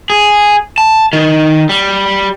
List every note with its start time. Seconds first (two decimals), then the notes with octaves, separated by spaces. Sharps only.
0.10 G#4
0.78 A5
1.13 D#3
1.69 G3